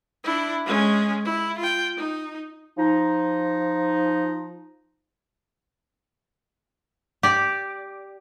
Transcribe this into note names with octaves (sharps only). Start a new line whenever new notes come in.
D4 E4
G#3 C#4
E4
F4 G5
D#4
F3 D#4
G4 D5